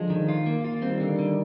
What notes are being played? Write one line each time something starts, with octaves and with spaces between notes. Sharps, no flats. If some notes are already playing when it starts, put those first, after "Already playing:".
Already playing: D3 F3 G#3
D#3
F4
A#3
F4
D#3 G3 C4
D3
D3